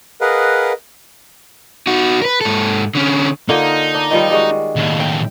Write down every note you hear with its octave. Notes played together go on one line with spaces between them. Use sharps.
G#4 A#4 B4 D#5 F5 F#5
D#4 F#4
A#4 B4
G#2 A4
D3 C#4
D3 A#3 D#4 F4
D4
D#3 F3 G3
G3 G#3 F#4
D#2 A2
G5